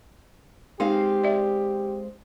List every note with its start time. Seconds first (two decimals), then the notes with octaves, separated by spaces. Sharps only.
0.80 G#3 C4 D#4 G4 F5
1.24 D5 E5